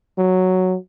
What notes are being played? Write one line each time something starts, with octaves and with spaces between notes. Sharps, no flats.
F#3